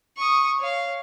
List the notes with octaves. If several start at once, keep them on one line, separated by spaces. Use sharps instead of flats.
C#6 D#6
C#5 F5